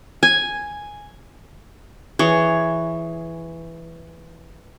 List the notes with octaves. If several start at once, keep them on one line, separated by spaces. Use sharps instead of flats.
G#5
E3 G#4 C#5